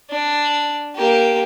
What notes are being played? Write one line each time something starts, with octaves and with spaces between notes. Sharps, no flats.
D4
A#3 G4